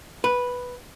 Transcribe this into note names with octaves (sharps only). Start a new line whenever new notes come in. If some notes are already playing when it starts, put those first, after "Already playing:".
B4